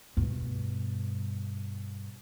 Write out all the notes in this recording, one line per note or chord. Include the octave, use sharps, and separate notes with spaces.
G2 B2